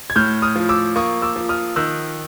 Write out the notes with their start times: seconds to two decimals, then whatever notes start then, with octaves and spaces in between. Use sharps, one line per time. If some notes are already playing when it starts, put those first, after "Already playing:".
0.10 G#6
0.16 A2 F6 G6
0.42 D#6 F6
0.56 F3
0.69 D6 E6
0.96 A#3 C#6 D#6
1.22 D6 E6
1.36 F3
1.49 D#6 F6
1.76 D#3 E6 F#6